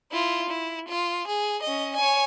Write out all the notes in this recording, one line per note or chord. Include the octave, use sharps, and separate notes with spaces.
E4 F4
E4
F4
G#4
C#4 D#5
C#5 G#5